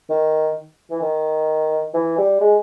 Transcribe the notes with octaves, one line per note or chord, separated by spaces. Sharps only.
D#3
E3
D#3
E3
G3
G#3